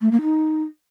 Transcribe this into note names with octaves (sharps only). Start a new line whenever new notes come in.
A3
A#3
D#4